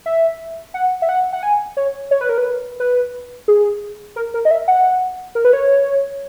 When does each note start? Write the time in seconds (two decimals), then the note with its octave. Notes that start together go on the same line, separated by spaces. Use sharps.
0.06 E5
0.74 F#5
1.02 E5
1.09 F#5
1.33 F#5
1.43 G#5
1.77 C#5
2.11 C#5
2.21 B4
2.29 A#4
2.38 B4
2.80 B4
3.48 G#4
4.16 A#4
4.34 A#4
4.45 D#5
4.51 E5
4.68 F#5
5.35 A#4
5.45 B4
5.53 C#5